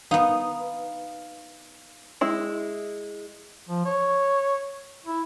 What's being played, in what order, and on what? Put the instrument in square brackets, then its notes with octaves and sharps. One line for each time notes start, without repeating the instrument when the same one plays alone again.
[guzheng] B3 D#4 [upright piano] F5
[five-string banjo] G#3 E4
[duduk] F3
C#5
E4